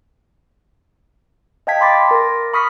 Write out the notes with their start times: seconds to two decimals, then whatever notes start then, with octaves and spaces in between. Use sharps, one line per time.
1.67 D#5 F5 G5 A5 G#6 B6
1.81 B5 C6 D6 A6
2.11 A#4 A#6
2.53 B5 C#6 D#6 F6 B6